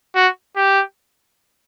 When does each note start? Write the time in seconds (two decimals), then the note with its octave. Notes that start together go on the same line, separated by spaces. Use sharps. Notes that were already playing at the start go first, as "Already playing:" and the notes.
0.15 F#4
0.56 G4